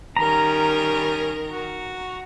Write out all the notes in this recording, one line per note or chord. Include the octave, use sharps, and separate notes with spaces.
D#3 G3 C#4 A#4 A#5
F#4